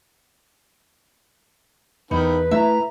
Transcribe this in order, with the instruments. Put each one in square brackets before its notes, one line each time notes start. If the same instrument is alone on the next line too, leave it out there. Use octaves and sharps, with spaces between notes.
[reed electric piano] E2 [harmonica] D#3 B5 [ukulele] D#4 [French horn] B4
[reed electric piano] A3 E4 [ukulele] E5 [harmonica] A#5